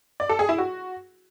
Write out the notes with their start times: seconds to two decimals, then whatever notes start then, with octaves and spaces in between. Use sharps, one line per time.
0.20 D5
0.29 A4
0.39 G#4
0.49 E4
0.58 F#4